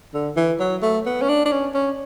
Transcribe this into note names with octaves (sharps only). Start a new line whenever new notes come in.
D3
E3
F#3
A3
B3
C#4
D4
D4
C#4
C#4